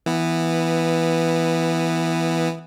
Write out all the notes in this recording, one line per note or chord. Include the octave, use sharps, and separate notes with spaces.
E3 B3